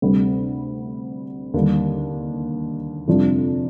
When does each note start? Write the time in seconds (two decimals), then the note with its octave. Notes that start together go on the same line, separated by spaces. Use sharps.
0.02 D2 C3 G3
1.54 D#2 D3 G3
3.08 F2 C3 G3 D4 F4